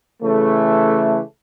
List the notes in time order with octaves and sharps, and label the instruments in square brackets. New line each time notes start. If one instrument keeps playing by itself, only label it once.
[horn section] C#3 E3 A3